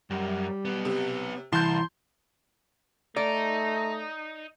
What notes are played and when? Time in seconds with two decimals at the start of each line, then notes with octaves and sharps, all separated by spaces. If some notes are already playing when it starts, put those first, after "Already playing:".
0.10 F#2 G3
0.65 F#3 B3
0.85 C3
1.52 C2 E3 E4 A5 C6 G6
3.16 A3 D#4 D5 A#5